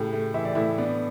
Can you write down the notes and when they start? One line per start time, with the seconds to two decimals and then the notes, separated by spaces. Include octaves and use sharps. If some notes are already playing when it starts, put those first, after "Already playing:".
Already playing: A2 C#3 G4
0.13 A3
0.34 E3 E5
0.45 D5
0.55 A2 E4 E5
0.78 B3 D4 D5